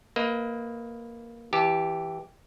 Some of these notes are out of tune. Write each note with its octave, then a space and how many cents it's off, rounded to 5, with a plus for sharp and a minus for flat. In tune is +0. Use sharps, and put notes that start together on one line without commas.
A#3 +0 B4 +0 D#5 +30
E3 +0 G4 +0 A5 -30